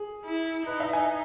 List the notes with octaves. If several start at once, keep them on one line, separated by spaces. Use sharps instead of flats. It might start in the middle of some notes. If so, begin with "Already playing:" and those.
Already playing: G#4
E4
D#4 B4
E5
G#5